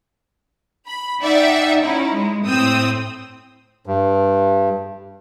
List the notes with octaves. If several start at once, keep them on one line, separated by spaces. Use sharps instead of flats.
B5
D#4 D5 E5 F#5 G5
C#4 D#4 E4
G#3
A2 C4 D#6 E6
G2